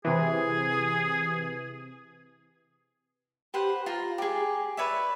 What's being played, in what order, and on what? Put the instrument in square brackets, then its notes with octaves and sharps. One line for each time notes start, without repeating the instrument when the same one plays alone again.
[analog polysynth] C3 E3 [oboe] G#4
[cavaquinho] G4 B4 C5 F#5
F4 A#5
G4 G#4
B4 C#5 D5 E5